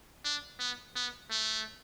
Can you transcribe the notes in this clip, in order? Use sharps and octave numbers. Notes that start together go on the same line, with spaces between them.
D4
B3
B3
A3